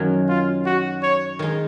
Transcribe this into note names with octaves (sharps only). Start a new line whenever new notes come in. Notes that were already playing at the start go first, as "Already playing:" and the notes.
Already playing: F#2 D#3 F#3
F4
F#4
C#5
D#3 G#3 D#4